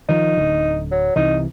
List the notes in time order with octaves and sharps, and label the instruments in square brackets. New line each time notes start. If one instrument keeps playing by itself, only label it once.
[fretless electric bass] D#3 F3 [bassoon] D#4
[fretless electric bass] D1 D3
[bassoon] F#3
[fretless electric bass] C2 C3 E3 [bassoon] D#4